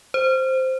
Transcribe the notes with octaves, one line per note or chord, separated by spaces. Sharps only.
C5